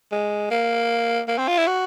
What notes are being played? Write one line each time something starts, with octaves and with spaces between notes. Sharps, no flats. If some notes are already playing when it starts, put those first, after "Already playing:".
G#3
A#3
A#3
C4
F4
E4
F#4